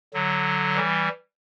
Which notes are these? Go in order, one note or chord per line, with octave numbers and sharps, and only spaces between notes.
D3 F#3
E3 G3